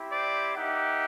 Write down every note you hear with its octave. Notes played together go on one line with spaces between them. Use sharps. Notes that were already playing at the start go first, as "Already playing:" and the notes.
Already playing: C4 E4 G4
C5 D5
A#3 D#4 G4 E5 F#5